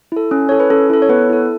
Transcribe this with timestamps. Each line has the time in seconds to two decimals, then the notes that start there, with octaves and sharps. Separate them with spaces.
0.12 E4 A4
0.31 C#4
0.49 E4 A4 C#5
0.60 B4
0.70 C#4 A4
0.90 E4 A4
1.02 C#5
1.09 B3 B4
1.30 E4 A4